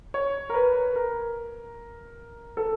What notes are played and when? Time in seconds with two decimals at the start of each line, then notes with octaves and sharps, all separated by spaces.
0.14 C#5
0.50 A#4
0.54 B4
0.96 A#4
2.57 A4